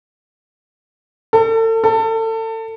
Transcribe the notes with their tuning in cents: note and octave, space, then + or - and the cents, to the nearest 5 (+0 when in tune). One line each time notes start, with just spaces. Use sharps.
A4 +35
A4 +30